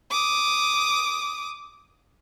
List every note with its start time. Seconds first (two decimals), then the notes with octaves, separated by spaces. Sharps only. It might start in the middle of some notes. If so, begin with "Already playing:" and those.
0.11 D6 D#6